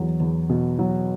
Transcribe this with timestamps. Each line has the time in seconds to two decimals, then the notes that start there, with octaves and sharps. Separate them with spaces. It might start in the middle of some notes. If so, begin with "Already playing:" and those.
Already playing: E2 F#3
0.20 E2
0.50 B2
0.79 F#3